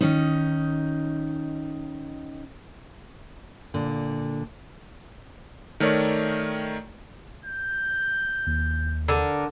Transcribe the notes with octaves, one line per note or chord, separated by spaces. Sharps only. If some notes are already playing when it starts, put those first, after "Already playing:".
D#3 C#4 D#4
A#2 D3
D#3 A3 A#4 C#5 D5
G6
D#2
D3 A#4